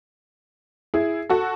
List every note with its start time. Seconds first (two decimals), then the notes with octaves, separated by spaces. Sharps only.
0.94 E4 G#4
1.29 F#4 A4